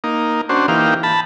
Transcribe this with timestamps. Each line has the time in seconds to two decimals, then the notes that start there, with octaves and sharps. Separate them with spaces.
0.04 A#3 D#4
0.49 C#4 D4 F#4 C5
0.68 E3 A#3 D#4 G4 F5
1.03 A5 B5